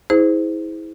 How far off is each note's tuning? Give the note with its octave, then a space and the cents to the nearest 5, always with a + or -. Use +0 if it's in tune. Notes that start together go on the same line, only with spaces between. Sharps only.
E4 -30 G#4 +0 C5 -20